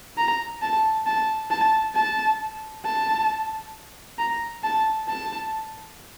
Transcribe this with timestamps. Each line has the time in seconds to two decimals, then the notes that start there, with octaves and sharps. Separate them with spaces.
0.18 A#5
0.62 A5
1.06 A5
1.51 A5
1.96 A5
2.86 A5
4.19 A#5
4.64 A5
5.09 A5